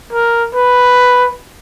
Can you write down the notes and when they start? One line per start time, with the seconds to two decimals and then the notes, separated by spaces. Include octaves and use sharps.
0.13 A#4
0.55 B4